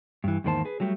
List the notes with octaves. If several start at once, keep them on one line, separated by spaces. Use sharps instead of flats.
G2 E3
E2 G#2 D#3 A#3 C5 A5
G#4 B4
F#3 G3 A3 F4 G4